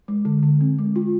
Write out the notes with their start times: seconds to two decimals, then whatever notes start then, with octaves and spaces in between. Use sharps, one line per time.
0.08 G#3
0.25 D3
0.43 D3
0.61 C4
0.78 G#3
0.96 F4